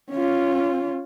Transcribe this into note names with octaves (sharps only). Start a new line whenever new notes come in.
C#4 F4